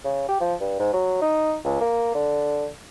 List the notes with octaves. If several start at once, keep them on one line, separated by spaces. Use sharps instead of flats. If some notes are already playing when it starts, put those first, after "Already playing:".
C#3
G4
F3
G2
G#2
F#3
D#4
C#2
A#3
D3